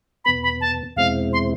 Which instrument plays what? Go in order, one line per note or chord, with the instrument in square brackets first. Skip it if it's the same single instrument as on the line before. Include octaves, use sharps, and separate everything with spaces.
[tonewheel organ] E2 B2 B3 [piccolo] B5
[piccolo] B5
A5
[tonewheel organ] E2 B2 G#3 C4 E4 [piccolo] F5
[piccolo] C6